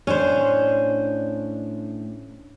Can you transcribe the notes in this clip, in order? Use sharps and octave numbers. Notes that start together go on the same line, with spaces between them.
A2 C#4 D4 C5